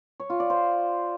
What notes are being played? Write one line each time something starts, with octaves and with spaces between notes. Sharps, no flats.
C#5
F4
D5
C5